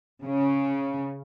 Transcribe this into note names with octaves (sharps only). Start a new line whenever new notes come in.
C#3